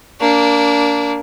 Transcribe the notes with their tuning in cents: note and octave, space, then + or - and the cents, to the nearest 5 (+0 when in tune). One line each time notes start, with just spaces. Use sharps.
A#3 +0 D4 -25